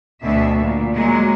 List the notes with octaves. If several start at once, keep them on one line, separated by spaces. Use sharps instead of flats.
D2 B2 D4 E5
A#2
F#3 G#3 A#3